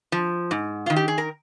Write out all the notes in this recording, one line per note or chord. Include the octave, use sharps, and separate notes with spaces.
F3
G#2
D#3 F4
G4
G#4
A#4